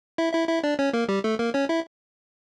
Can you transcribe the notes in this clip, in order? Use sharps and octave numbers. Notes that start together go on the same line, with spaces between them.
E4 E5
E4 E5
E4 E5
D4 D5
C#4 C#5
A#3 A#4
G3 G4
A3 A4
A#3 A#4
C#4 C#5
E4 E5